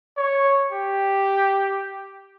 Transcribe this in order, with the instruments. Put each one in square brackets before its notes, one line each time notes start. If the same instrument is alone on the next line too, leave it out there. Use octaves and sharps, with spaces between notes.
[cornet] C#5
G4